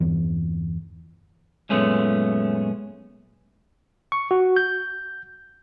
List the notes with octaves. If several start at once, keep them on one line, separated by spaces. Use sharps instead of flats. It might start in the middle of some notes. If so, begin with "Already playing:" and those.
G1 E2 E3
F#2 A#2 G#3 A3 B3 C#4
C#6
F#4
G6